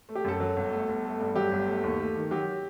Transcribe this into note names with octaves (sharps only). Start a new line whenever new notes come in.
A3
G4
F#2 A4
F#3
G1
A3
G1
A3
G2
F#3 G4
G1
A3
D#2
A3
D#3
F#3 G4